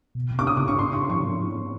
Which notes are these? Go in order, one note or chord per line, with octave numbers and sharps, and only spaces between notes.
B2
C3
D6
C#3 D#6
D6
C#6
C6
C#6
C6
F3 C#6
F3